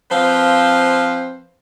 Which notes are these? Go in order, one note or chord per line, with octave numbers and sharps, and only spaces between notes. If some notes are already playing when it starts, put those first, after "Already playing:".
F3 C4 B4 C5 F5